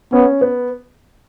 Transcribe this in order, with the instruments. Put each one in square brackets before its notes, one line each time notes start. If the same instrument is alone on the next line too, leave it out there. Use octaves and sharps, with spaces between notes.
[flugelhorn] B3 [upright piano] C#4
[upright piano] B3